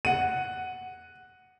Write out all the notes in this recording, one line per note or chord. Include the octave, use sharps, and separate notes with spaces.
F#5 D#7